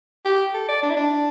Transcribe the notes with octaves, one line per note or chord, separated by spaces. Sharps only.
G4
A4
D5
D4
E4
D4